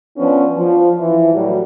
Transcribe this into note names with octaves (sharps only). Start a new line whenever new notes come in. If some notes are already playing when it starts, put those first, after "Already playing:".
F3 B3 C#4 D4
F3
E3
A2 F#3 G3 F#4